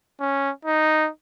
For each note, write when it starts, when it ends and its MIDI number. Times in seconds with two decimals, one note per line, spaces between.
0.20 0.50 61
0.65 1.10 63